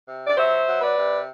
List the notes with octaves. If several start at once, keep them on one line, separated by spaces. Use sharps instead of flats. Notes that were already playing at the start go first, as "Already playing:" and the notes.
C3
D5
F#3 C5 E5
F#3
B4 D5
C3